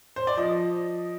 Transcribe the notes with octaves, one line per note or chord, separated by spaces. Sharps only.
C5
D5
F3 D#5